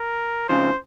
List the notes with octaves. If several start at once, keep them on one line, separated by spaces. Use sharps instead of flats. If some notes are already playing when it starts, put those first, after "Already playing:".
Already playing: A#4
F2 C#3 F3 C5